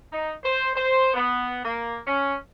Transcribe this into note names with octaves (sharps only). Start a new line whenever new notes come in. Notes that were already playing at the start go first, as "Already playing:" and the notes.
D#4
C5
C5
B3
A#3
C#4